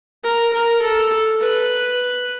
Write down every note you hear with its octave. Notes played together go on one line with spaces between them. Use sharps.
A#4
A#4
A4
B4